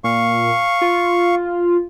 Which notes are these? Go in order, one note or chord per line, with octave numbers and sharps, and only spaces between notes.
A#2 F5 C#6
F4